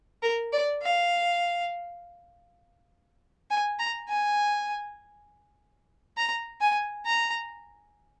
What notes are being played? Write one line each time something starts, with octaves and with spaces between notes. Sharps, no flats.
A#4
D5
F5
G#5
A#5
G#5
A#5
G#5
A#5